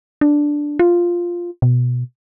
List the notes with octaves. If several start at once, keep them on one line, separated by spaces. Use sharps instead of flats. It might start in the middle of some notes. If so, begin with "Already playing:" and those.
D4
F4
B2